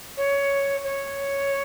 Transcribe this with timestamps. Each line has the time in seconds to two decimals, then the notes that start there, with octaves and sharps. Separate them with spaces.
0.17 C#5
0.84 C#5